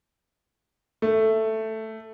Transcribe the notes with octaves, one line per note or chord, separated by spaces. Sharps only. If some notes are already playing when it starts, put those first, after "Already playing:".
A3